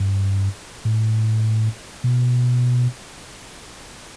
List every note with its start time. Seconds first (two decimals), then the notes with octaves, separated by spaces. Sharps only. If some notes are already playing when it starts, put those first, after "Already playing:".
Already playing: G2
0.85 A2
2.04 B2